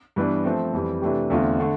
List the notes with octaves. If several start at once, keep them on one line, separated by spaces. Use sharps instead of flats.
G2 E3 B3 D4
F3 A3 C4
F2 E3 G3
C3 E3 A3 D4 G4
E2 D3 A3 C4 F4
D3 A3